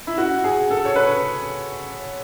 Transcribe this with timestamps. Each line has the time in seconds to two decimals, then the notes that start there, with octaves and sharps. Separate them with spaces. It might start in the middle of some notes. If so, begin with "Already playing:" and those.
0.07 E4
0.18 F#4
0.44 G#4
0.70 A4
0.85 C#5
0.96 B4